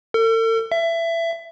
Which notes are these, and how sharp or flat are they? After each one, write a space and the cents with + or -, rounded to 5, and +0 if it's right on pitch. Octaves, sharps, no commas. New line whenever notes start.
A4 +45
E5 +20